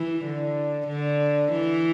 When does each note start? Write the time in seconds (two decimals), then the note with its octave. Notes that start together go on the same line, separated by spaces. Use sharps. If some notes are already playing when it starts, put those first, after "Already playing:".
Already playing: E3
0.25 D3
0.88 D3
1.52 E3